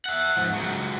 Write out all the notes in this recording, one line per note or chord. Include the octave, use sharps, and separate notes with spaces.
E5 F#5
G#2 F3
C#2 F#3